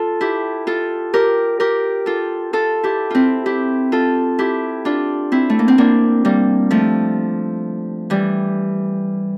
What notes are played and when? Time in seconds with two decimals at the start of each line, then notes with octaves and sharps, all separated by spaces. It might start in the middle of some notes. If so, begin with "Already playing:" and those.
Already playing: F4 A4
0.21 E4 G4
0.67 F4 A4
1.14 G4 A#4
1.60 G4 A#4
2.06 F4 A4
2.53 F4 A4
2.83 E4 G4
3.10 C4 E4 F4
3.46 E4 G4
3.92 F4 A4
4.39 E4 G4
4.85 D4 F4
5.32 C4 E4
5.50 A3
5.59 A#3
5.68 C4
5.78 A#3 D4
6.25 G3 A#3
6.71 F3 A3
8.10 E3 G3